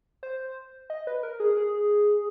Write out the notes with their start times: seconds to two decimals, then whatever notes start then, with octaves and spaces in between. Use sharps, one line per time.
0.23 C5
0.90 D#5
1.07 B4
1.23 A#4
1.40 G#4
1.57 G#4